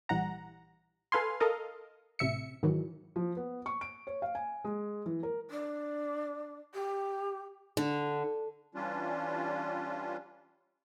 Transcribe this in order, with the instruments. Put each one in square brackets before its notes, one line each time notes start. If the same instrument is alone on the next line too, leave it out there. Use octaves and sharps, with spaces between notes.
[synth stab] A#1 E3 G3 F#5 A#5
A4 B4 F5 G#5 C6
A4 A#4 D#5 F5
A1 C3 E5 C#7
G#2 D#3 E3 F#3
[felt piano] F3
B3
C#6
D7
C#5
F5
G#5
G#3
E3
A#4
[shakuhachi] D4
G4
[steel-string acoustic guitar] D3
[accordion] E3 G3 C#4 D4 F4